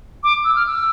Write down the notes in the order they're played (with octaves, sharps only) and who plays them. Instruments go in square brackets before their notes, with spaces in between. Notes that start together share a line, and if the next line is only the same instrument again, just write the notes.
[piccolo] D6
E6
F6
E6